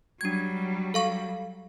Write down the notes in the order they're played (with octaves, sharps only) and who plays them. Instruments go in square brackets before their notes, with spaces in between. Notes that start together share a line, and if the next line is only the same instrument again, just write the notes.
[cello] F#3 G3 [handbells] D4 G#6
[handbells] A4 F5 C#6